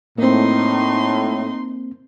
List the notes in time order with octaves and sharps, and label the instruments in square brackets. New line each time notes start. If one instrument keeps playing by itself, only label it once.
[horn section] A2 [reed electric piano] A#3 C4 [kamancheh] D#4 C6